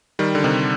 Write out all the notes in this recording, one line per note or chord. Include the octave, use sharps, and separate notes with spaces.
D#3 G3
D3
C3 D#3